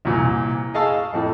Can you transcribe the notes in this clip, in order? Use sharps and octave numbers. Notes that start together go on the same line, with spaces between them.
C2 A#2 E3
G#4 D#5 F5 A5 C#6 E6
F2 A2